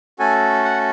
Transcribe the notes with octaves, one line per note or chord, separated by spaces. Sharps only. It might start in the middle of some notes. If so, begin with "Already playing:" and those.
A3 C#4 F#4 A4 G#5
F#5